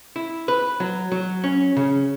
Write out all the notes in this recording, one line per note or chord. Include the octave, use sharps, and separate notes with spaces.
E4
B4
F#3
F#3
C#4
C#3